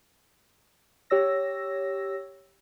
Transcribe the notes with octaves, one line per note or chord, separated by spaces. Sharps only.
G4 C#5 E6 A#6